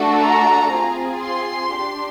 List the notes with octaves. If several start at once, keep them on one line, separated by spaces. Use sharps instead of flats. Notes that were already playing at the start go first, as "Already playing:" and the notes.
Already playing: A3 D4 F#4 A4
A#5
C4 F4 G#4
C6
D4 G4